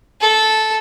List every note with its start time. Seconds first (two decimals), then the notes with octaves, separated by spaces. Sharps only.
0.21 A4